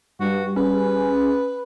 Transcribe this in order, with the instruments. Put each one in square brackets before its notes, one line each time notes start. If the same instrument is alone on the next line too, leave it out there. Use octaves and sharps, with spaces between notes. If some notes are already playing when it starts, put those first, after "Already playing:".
[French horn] G2 [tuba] G3 [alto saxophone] F#4
[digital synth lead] C#4 [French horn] G#4 [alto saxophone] B4